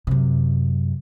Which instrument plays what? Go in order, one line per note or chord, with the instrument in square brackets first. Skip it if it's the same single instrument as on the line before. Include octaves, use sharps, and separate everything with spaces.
[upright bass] F#2 C3